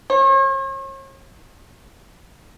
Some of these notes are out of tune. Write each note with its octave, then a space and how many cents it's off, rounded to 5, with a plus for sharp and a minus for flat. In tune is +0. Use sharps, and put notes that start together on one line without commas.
C#5 -45